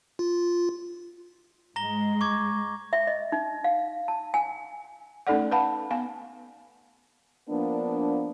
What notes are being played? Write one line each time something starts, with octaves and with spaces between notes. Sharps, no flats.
F4
G#2 G#3 A#5 A#6 G7
C#6 D6 G#6
E5
D#5
D#4
F5
A5
G#5
A3 C#4 D#4 A4 D5 F#5
B4 F5 F#5 A5 B5
B3 F5 G#5
F3 A#3 B3 D4